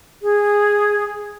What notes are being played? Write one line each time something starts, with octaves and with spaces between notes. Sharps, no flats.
G#4